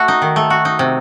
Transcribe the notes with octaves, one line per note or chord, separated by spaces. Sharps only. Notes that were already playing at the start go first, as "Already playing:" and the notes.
Already playing: A3 F#4
D#4
D#3
A3
F#4
D#4
C3